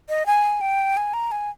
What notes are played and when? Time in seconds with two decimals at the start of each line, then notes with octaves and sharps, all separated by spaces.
0.09 D#5
0.26 G#5
0.61 G5
0.97 G#5
1.13 A#5
1.31 G#5